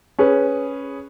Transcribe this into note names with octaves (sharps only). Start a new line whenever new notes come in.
C#4 G#4 B4